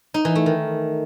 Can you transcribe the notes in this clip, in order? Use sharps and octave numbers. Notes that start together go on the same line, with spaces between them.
D#4
E3
A3
D#3